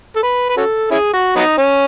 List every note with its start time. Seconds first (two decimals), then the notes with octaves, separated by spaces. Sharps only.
0.16 A4
0.23 B4
0.49 B4
0.57 C#4 F#4 A4
0.91 C#4 E4 G#4
1.13 F#4
1.36 F#3 B3 D#4
1.58 C#4